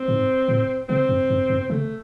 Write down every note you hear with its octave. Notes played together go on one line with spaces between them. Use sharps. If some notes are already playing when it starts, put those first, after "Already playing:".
Already playing: C4
G#2
A2
C3 C4
F#2
F#2
F#2
C4
C#3 A3